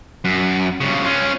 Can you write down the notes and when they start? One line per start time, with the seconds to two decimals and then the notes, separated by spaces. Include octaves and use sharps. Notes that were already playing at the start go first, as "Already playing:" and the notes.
0.25 F#2
0.81 G2 C#3
1.05 C#4 F4